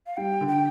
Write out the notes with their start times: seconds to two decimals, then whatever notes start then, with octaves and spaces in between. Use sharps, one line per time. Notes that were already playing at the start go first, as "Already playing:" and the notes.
0.07 F5
0.17 G3 G5
0.41 D3
0.48 G5